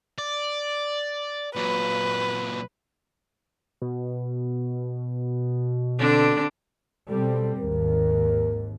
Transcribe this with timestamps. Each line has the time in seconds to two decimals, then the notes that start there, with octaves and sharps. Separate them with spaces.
0.18 D5
1.56 A#2 F#3 B4
3.82 B2
5.99 D3 C4 D4
7.10 B2 G3 C4 A4
7.59 G#1 D#2 A#4